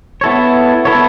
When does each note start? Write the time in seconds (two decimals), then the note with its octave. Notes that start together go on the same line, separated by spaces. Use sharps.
0.21 B3 E4 A4 C#5
0.85 B3 E4 A4 C#5